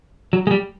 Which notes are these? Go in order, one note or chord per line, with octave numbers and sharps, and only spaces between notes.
F#3
G#3
G3